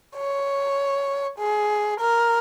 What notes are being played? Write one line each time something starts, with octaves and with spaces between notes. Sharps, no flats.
C#5
G#4
A#4